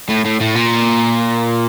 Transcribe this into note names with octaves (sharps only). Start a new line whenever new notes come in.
A2
A2
A2
A#2